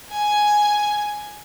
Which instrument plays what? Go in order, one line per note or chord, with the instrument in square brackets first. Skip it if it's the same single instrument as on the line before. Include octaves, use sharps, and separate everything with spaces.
[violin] G#5